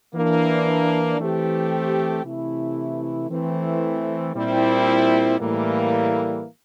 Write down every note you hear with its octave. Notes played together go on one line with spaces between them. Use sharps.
E3 A#3 D4
E3 A3 C4 G4
C3 E3 A3 E4
E3 A3 C4
A#2 G3 C4 E4
A2 E3 G3 A#3